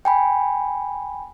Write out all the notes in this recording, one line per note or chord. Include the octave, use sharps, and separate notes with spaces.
G5 G#5 B5